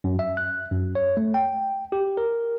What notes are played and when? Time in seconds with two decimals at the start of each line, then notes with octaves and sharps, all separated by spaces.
0.04 F#2
0.19 E5
0.37 F#6
0.71 F#2
0.95 C#5
1.17 A3
1.34 G5
1.92 G4
2.17 A#4